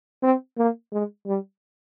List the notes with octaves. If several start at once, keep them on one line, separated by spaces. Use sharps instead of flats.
C4
A#3
G#3
G3